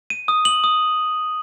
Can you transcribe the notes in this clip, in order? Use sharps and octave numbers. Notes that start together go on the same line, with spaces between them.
D#7
D#6
F#7
D#6